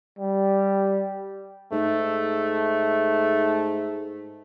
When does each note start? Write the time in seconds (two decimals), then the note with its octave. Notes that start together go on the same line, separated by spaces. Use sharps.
0.19 G3
1.72 G#2 A3